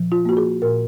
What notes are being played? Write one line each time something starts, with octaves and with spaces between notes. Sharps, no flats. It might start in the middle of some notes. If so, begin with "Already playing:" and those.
Already playing: A#2 F3
F4
A#3 F#4
G#4
A#2 A#4